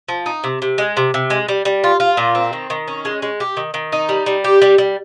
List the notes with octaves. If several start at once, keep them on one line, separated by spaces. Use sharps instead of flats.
F3
D#4
C3
C3
G#3
C3
C3
G#3
G3
G3
F4
F4
A#2
C4
D#3
D#3
C#4
G#3
G#3
G4
D#3
D#3
D#4
G3
G3
G4
G3
G3